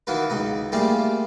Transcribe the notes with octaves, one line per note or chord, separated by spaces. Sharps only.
D#3 E3 F#3 F4 B4
C#2 D#4 A#5
G3 A3 A#3 F4 G4 G#4